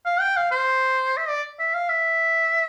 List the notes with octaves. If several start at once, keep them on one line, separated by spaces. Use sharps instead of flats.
F5
G5
F5
C5
E5
D5
E5
F5
E5